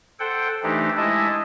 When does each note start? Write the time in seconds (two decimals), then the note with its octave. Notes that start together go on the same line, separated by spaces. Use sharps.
0.20 A4 C5 F#5 G5
0.63 E3 A3 D4 D#4 G4 C5
0.97 G#3 E4 D#5 E5 A5